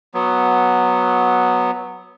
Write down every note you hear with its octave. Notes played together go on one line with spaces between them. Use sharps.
F#3 B3